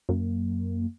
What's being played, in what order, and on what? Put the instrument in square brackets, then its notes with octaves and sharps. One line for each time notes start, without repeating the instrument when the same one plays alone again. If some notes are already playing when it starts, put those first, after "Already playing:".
[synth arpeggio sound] F#2 A#3